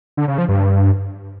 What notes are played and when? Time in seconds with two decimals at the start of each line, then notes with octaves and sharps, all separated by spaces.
0.17 D3
0.28 C#3
0.38 F3
0.49 G2